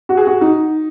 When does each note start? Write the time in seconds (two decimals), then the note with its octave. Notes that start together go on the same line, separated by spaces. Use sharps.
0.09 F#4
0.17 G#4
0.27 F#4
0.41 D#4